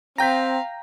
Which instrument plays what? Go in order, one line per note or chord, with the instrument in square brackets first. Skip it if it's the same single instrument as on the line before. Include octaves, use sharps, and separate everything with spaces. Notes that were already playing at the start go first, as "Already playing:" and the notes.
[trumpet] C4 [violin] F5 [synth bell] G5 A#6 [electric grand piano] A#5 G6 B6